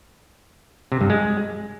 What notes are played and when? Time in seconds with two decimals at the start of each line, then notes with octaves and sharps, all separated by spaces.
0.92 C3
1.01 G2
1.10 G#3